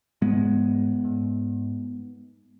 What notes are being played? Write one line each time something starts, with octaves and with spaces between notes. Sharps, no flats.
G#2 G#3 B3
G#2